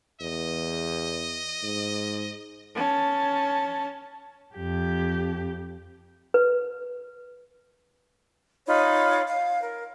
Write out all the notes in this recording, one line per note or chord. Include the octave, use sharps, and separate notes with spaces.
E2 D#5
G#2
C#4 A5
F2 G4
B4
D#4 F4 C#5 B5
F5
A#4